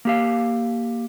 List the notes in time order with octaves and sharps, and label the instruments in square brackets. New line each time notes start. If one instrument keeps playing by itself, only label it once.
[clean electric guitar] A#3 G4 F5